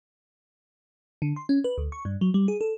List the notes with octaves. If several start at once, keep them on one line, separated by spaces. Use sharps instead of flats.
D3
C6
C#4
B4
D2
C#6
G2
F#3
G3
G#4
A4